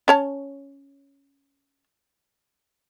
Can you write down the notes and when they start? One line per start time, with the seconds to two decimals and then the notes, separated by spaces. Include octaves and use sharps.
0.08 C#4 C#5 A5